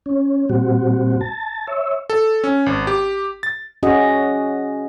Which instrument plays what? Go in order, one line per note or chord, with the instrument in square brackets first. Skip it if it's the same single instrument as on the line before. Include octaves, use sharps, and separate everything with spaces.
[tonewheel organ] C#4
A#2 G3 C4 F#4
A5
C#5 E5
[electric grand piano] A4
C#4
G#1
G4
A6
[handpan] C#4 F#4 G#4 D#5